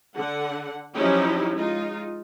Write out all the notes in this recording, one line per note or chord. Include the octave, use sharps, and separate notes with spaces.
D3 F#5
F3 F#3 C#4 D#4 E4 G4
G#3 D#4 F4